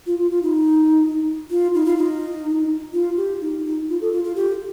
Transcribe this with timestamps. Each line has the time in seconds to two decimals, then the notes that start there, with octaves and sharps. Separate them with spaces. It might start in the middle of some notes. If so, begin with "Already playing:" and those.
0.06 F4
0.19 F4
0.30 F4
0.43 D#4
1.50 F4
1.74 D#4
1.86 F4
1.97 D#4
2.93 F4
3.17 G4
3.41 D#4
3.64 D#4
3.89 F4
4.01 A4
4.12 F4
4.24 F4
4.36 G4